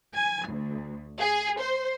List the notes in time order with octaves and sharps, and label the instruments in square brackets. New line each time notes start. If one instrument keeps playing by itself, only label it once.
[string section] G#5
D2
G#4
C5